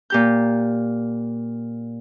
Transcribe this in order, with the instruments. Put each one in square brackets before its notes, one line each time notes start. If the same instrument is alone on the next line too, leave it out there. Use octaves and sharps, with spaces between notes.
[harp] A#2 G4 G6